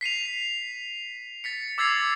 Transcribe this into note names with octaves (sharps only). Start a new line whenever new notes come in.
B6 C7 D#7 F7
A6 B6 C#7
D6 E6 G#6 A6 C7 F7